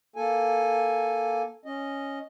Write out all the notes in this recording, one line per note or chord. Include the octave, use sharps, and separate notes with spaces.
A#3 A4 G#5
C#4 D#5